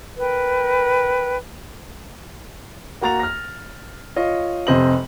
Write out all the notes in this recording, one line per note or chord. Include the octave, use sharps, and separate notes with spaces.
A#4 B4 G5
A#3 F#4 A#5 A6 F7
F6 A#6
F4 C#5 D#5
F1 C3 C5 D#5 F#7